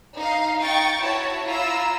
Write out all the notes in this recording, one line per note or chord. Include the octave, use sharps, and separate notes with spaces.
D#4 F5
D#4 G5 C#6 A6
E4 F#4 C#5 A5
E4 F4 A#5 E6